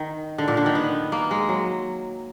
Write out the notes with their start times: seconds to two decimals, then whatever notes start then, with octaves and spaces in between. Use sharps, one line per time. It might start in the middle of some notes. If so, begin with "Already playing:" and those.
Already playing: D#3
0.38 D3
0.48 A#2
0.57 D3
0.66 D#3
0.75 B3
1.12 A#3
1.31 G#3
1.49 F#3